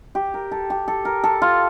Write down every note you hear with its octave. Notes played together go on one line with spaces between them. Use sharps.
G4
A#4
A4
G4
A4
A#4
A4
F4